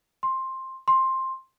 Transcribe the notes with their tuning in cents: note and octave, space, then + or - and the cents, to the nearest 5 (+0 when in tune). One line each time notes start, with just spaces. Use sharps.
C6 +10
C6 +10